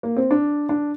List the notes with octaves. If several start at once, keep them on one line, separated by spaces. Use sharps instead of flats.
A#3
C4
D4
D4